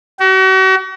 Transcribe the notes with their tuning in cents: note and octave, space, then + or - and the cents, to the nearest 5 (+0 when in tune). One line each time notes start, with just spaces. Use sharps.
F#4 +40